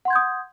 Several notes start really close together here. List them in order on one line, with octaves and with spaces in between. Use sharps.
F#5 C6 G#6 G6 D#6